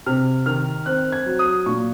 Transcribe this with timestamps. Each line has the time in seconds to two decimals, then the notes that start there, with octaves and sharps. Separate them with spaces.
0.06 C3 F6
0.46 D#3 F6
0.86 C4 F#6
1.12 G#6
1.26 F#3
1.39 D#6
1.66 A#2 C#6